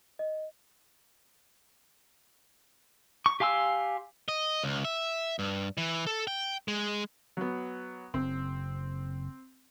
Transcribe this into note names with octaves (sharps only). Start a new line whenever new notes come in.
D#5
C#6
G4 F5 G#5 C6 E6
D#5
C#2
E5
G2
E3
A4
G5
G#3
F#3 B3
F#1 C4